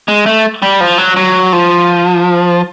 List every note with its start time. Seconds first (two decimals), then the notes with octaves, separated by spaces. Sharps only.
0.08 G#3
0.26 A3
0.62 G3
0.80 F3
0.98 F#3
1.17 F#3
1.53 F3